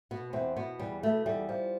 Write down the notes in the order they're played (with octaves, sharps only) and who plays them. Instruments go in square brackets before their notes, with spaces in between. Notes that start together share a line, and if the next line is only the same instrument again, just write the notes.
[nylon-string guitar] B2 B3
E2 C4
B2 B3
E2 G3
B2 A3
E2 G3
F3